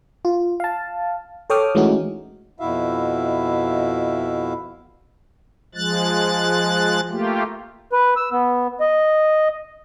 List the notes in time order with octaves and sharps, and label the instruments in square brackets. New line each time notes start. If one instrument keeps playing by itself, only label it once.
[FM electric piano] F4
F5 A5
A4 C#5 G5 D6 D#6 F6
E3 G#3 A3 C#4 D#4 F#4
[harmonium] F2 B2 E4 F#4 E5 F5
[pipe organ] F3 G#3 F#6 A6
A3 A#3 F4 G4
[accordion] B4
E6
B3
D#5